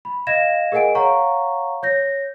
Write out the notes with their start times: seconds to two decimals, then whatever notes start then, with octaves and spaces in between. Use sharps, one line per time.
0.05 B5
0.27 D#5 F5 G#6 A#6 E7
0.72 G#4 A#4 D#5 F#5 G#5 D7
0.95 C#5 F5 F#5 A#5 C#6
1.83 C#5 G6 A#6